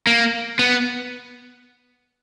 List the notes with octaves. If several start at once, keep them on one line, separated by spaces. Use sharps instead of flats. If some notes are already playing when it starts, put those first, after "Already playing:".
A#3
B3